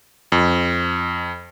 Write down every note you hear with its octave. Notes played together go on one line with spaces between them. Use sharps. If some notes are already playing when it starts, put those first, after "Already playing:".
F2